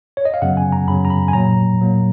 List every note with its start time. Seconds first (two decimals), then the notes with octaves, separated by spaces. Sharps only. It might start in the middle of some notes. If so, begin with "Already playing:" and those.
0.17 C#5
0.25 D#5
0.34 F5
0.42 F#2 C#3 F#3 B3 F#5
0.57 G#5
0.72 A#5
0.87 F#2 C#3 F#3 B3 B5
1.05 A#5
1.10 B5
1.28 G#5
1.33 A#2 F#3 A#3 A#5
1.80 A#2 F#3 A#3